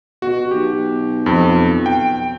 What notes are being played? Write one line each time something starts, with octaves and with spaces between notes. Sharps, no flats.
B2 F#4
B1 G4
F2
G5